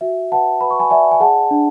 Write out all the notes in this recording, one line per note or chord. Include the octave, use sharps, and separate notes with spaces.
F#4 E5
B4 F#5 A5
B4 B5
C#6
G#5 B5
D5 E5 G#5
G#5
G#4 F#5 A5
D4